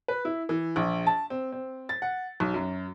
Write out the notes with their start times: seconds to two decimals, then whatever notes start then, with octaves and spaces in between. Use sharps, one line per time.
0.08 B4
0.25 E4
0.49 E3
0.76 A#1
1.07 A5
1.30 C4
1.52 C4
1.89 A6
2.02 F#5
2.40 B1
2.54 F#2